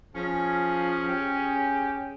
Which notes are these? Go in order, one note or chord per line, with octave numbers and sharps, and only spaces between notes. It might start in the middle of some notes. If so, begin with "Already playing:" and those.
F3 C#4 G#4
G4